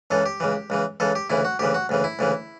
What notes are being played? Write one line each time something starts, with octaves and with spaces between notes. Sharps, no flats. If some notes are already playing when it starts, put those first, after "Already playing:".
C#2 C#3 E3 A4
G4
C#2 C#3 E3
C#2 C#3 E3
C#2 C#3 E3 A4
G4
D2 C#3 E3 E4
F#4
D2 C#3 E3 G4
F#4
D2 C#3 E3
E4
D2 C#3 E3